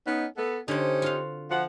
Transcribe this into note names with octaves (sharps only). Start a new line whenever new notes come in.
B3 C#4 D#4
B3 A4
D3 C4 C#4 D#4 G4
F4 F#4 F5
F3 F#5